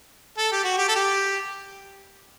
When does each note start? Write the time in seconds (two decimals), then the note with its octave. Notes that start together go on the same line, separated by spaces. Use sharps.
0.38 A4
0.52 G4
0.64 F#4
0.78 G4
0.89 A4
0.96 G4